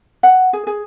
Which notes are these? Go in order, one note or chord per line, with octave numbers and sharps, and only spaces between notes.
F#5
G#4
G#4